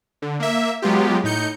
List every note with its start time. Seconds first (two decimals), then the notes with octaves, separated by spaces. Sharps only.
0.22 D3
0.40 A#3 E5
0.82 F#3 G#3 B3 F4 G4
1.24 A2 D#4 G6 C#7